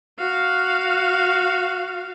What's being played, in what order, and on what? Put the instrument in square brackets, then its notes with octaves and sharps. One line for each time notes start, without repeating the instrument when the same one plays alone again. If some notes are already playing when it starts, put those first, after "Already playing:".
[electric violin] F#4 F5